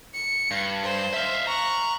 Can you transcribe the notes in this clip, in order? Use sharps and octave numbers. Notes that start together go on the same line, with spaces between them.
C#7
G2
C5
E5 F5
A#5 C#6 F#6